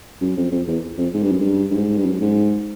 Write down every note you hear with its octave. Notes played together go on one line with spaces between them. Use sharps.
F#2
F2
F2
E2
F2
G#2
G2
F#2
G2
G2
G#2
G2
F#2
G#2